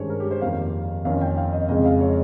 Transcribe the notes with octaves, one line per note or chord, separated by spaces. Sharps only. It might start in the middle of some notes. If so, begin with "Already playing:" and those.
Already playing: G2 D#3 G#3 C#4 C5 C#5
A#4
G4
C5
F2 D#3 A#3 F5
F2 D#3 A#3 C#4 F5
G5
F5
D#5
F2 C#3 G#3 C4 D#5
F5
C#5